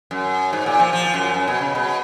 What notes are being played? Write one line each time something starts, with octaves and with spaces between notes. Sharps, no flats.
F#2
G#2
A#2
F3
F3
F#2
F#2
B2
C#3
B2